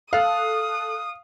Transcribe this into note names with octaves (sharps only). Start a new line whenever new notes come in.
A4 F5 D#6 F#6